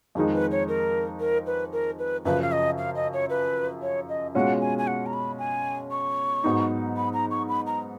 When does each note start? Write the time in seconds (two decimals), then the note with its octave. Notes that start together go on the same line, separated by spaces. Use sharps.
0.15 F2 D#3 G#3 D#4 G#4
0.34 B4
0.51 C#5
0.68 A#4
1.20 A#4
1.47 B4
1.73 A#4
1.99 B4
2.25 F#2 C#3 F3 B4
2.42 F5
2.52 D#5
2.78 F5
2.95 D#5
3.13 C#5
3.30 B4
3.82 C#5
4.09 D#5
4.35 B2 G#3 C#4 F4 F#5
4.61 G#5
4.78 G#5
4.87 F#5
5.06 A#5
5.13 B5
5.39 G#5
5.91 C#6
6.44 G#2 F#3 B3 D#4
6.97 B5
7.13 A#5
7.31 C#6
7.49 B5
7.67 A#5